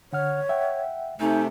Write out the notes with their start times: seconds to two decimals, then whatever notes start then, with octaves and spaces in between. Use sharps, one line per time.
0.13 D3 C#5 F#5 F6
0.49 E5 F#5 G5
1.20 C3 A3 D#4 G#5